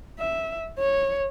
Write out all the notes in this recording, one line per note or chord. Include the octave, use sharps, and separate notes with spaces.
E5
C#5